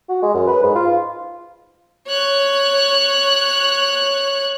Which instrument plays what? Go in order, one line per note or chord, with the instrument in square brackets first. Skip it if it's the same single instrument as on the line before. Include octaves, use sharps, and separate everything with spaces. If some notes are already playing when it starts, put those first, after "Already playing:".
[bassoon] F#4
G#3
F#2
B4
G#2
F4
[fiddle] C#5 F#6